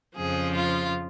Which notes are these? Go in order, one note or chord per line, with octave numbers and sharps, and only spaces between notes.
F2 C#3 F3 G#4
F4